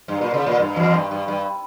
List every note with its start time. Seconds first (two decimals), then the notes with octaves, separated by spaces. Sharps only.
0.08 G2
0.21 A#2
0.34 C#3
0.46 A#2
0.59 G2
0.76 E2
0.94 G2
1.11 G2
1.28 G2